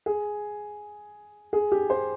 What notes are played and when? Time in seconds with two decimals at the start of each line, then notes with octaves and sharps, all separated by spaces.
0.06 G#4
1.53 G#4
1.72 G4
1.90 C5